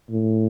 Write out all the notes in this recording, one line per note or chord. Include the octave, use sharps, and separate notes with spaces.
A2